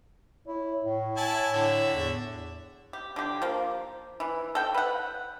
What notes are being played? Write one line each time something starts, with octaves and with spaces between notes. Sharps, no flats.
E4 C#5
A2
E4 G#5 A5
A2 D3 E5
E2
G4
D3 G4
F3 A#3
E3
A4 G5
B4 F#5